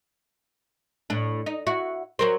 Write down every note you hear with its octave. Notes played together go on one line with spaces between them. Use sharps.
A2 D4
D#4
E4 F#4
F#3 A#4 C5